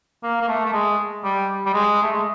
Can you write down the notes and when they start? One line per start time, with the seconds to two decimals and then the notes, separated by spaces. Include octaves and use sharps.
0.23 A#3
0.41 A#3
0.48 A3
0.66 A3
0.73 G#3
1.24 G3
1.66 G3
1.73 G#3
2.03 A3
2.13 G#3